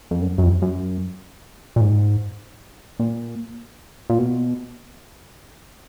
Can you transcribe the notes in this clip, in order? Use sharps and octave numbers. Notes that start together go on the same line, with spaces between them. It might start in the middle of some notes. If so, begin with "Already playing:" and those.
F2
F#2
F#2
F2
F#2
A#2
G#2
A#2
A#2
B2